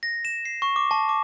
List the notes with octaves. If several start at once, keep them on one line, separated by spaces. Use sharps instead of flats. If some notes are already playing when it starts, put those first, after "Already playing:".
A#6
E7
C7
C#6
D6
A5
D6